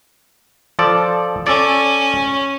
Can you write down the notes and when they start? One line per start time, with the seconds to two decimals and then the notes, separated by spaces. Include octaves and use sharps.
0.79 F3 A4 D5
1.47 C#4 A4 D5